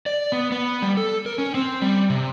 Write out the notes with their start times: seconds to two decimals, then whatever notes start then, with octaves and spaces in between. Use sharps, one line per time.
0.06 D5
0.32 B3
0.52 B3
0.82 G3
0.97 A4
1.26 A#4
1.38 C#4
1.55 C4
1.82 G3
2.10 C3